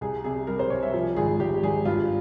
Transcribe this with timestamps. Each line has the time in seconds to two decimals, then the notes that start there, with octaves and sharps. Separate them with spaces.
0.01 C2 G#4
0.24 C3 G#4
0.47 G3 A#4
0.59 C5
0.70 C2 C#5
0.83 E5
0.94 F3
1.16 G#1 G#4
1.40 G#1 G4
1.63 G#1 G#4
1.85 G2 F4